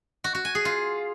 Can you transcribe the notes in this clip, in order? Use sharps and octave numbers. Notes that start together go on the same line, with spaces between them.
F#4
F#4
G#5
G#4
F4